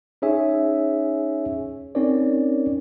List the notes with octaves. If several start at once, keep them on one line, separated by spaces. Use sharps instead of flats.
C#4 D#4 G#4 C#5 E5 G#5
C4 C#4 D#4 A#4 C#5 D5